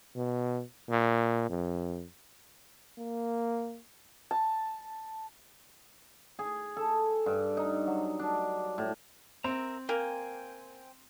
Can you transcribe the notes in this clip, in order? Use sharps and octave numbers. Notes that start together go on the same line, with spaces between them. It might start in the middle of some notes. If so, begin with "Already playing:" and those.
B2
A#2
F2
A#3
A5
G#4
A4
G2
D#4
F#3
D4
A2
C4 A#4 E5 A#5
A#3 C5 G5 G#5